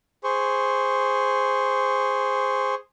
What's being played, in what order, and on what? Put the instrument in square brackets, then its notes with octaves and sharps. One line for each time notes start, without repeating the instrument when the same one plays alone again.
[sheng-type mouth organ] G#4 C5 C#6